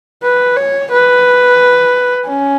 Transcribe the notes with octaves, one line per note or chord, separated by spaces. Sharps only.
B4
C#5
B4
C#4